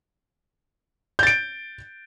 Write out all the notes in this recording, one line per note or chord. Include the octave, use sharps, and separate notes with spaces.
G6 A6 D7